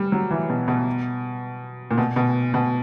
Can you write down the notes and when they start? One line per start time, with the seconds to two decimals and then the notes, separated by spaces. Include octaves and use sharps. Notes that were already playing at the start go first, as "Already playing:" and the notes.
Already playing: G3
0.12 F#3
0.31 E3
0.49 B2
0.68 B2
1.91 A#2
1.97 B2
2.16 B2
2.54 B2